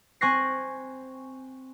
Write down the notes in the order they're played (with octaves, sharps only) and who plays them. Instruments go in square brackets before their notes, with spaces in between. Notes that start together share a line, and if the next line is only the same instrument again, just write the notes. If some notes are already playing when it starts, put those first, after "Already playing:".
[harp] C4 G#5 C#6 F#6 A#6 C7